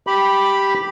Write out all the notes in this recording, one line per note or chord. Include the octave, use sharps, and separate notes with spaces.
G4 B5